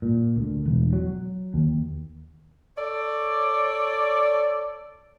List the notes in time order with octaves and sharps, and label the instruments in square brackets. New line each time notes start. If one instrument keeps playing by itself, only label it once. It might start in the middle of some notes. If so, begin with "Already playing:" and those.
[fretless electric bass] A#2
D2
E1
F#3
D#2
[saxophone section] A4 C#5 D5